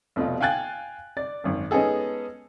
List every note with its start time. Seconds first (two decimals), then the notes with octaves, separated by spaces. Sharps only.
0.16 F1 B2 A3 F4
0.41 F5 G5 G#5 F#6 G#6 A6
1.17 D5 A6
1.44 G#1 F#2
1.71 G#3 B3 C#4 D#4 G#4 A4